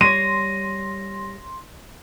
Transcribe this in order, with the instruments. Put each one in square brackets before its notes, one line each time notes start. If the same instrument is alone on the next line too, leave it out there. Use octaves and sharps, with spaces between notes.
[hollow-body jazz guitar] G3 C#5 [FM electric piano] C6 [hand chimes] A#6 [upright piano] D#7